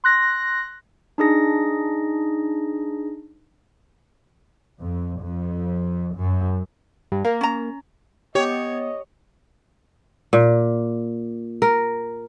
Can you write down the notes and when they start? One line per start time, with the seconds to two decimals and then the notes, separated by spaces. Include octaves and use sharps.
0.04 C6 F#6 A#6
1.18 D4 D#4 G#4 A#6
4.81 F2
5.22 F2
6.16 F#2
7.12 G2
7.25 A#3 A#4
7.41 C#4 A#5
8.35 B3 G4 C#5 D#5
10.33 A#2
11.62 A#4